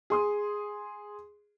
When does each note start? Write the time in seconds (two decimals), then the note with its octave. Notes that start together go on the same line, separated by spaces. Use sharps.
0.10 G#4 C6 D#6